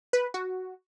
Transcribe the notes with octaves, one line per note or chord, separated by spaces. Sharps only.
B4
F#4